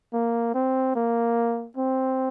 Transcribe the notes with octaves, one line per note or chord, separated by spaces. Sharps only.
A#3
C4
A#3
C4